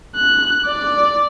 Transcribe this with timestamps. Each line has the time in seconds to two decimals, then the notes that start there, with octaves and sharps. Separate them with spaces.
0.16 F#6
0.66 D5